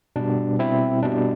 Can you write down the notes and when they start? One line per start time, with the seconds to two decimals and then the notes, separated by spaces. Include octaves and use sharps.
0.16 B2 G3 D4
0.59 C4 E4
1.03 B2 G3 D4